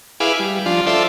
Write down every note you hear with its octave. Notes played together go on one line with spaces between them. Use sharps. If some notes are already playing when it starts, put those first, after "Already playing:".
E4 G#4 B4 F5 D6
G3
F3 D4 F4
F4 A4 C5 D5 E5